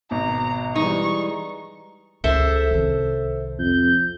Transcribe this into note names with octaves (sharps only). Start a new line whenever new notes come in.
G#1 B2 A#5
E3 G3 G#3 D#4 C#6
C#2 A4 C5 E5
C2 D#3
F2 G6